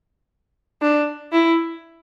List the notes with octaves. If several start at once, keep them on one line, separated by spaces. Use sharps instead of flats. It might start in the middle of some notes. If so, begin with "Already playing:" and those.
D4
E4